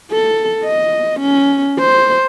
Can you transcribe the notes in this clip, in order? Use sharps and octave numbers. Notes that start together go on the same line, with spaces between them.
A4
D#5
C#4
C5